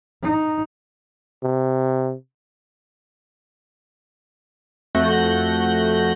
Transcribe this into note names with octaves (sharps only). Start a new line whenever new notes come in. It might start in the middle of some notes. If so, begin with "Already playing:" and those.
D#4
C3
F2 A3 F#4 F#6 G6 A#6